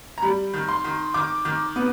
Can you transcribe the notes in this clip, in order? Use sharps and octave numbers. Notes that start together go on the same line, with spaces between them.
A#5
G3 B5
D#3
C6
D#3
D#3 D6
D#3
B3